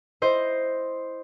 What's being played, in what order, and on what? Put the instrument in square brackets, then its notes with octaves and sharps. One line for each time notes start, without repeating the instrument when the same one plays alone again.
[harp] E4 C5 D#5